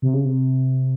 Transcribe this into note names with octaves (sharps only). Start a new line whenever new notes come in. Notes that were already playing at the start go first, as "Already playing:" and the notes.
C3
C#3
C3